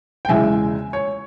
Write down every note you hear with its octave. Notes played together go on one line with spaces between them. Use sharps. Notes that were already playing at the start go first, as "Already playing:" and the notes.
G5
E2 C#3 E3 G#3 E5 G#5
C#5